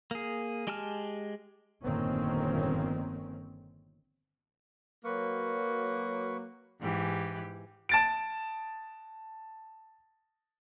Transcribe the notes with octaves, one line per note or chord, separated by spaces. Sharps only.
A#3 G#4
G#3 G4 G#5 A5 F6
G1 F2 A#2 D#3 C4 C#4
F#3 A#3 B4 C#6
G#2 E3 G4
A5 A6 D7